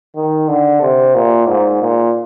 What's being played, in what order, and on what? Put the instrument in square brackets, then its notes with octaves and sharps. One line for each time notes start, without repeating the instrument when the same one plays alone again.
[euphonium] D#3
D3
C3
A#2
G#2
A#2